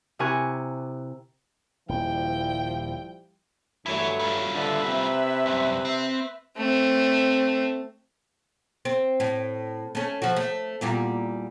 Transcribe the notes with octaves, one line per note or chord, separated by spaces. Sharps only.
C3 E4 A#4 G#5 C#6 F#6
D#1 F3 G3 E4 G5
G2 E3 F#3 A3 E4 C#5
G3 F4
D3 B4 E5
C3
C2 F#2
C4
A3 C4
C4
A2
A3 C#4
F3 F#4
A3
E2 A#2 G3